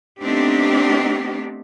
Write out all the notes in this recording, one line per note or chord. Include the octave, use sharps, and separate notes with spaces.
A3 B3 C4 D4 D#4 G4